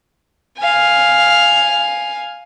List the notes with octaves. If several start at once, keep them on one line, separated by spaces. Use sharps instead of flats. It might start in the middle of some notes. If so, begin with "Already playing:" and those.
F5 G#5